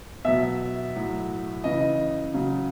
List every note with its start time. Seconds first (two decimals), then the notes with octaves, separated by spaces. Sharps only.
0.25 B2 F#3 E5
0.95 A2 F#3
1.64 C#3 E3 D#5
2.34 C#3 F#3